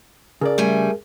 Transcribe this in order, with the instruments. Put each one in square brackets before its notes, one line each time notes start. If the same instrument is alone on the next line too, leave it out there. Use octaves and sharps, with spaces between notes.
[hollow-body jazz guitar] C#3 D5 [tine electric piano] G#4 A#4
[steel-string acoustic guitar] G3 A3 G#5